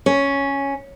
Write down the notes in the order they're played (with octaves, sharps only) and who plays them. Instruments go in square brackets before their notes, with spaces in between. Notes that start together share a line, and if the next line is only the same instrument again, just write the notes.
[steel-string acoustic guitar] C#4